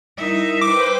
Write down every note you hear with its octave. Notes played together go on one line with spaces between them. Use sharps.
G3 D#4 E4 A#4 E5
B4 C5 G5 D6